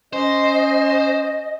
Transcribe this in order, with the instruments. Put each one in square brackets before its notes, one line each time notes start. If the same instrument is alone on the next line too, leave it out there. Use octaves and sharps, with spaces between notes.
[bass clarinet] C#4 [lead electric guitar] C5 [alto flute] D#5